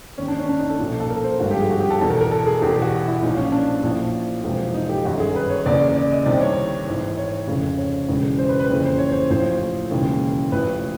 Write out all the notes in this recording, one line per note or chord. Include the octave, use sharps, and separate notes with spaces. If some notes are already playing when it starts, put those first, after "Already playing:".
D#2 D#3 C#4
D4
C#4
D4
D#4
A4
B1 A#2 F3
A4
A#4
C5
G#1 G2 D3 F3 F#4
G4
G#4
F#4
G4
A4
E2 B2 A4
A#4
A#4
A4
G#4
E2 B2 G4
G4
F#4
E4
B1 A#2 F3 D#4
C#4
D4
A#1 A2 F3
E1 E2 C3 F3
D#4
G4
G1 F#2 D#3 F#4
G#4
B4
C#5
F#1 E2 C#3 E3 D5
D5
D#5
C2 C3 D#3 D5
C#5
G#1 G#2 E3
C#5
F1 F2 C#3 F3
C#5
E1 E2 C#3
C5
B4
B4
F#1 F2 C#3 E3
C5
C#5
C5
A1 A2 F3 C5
E1 D#2 C#3 E3
A1 A2 F3 B4